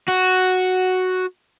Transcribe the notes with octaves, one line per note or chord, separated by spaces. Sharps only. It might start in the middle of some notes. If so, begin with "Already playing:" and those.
F#4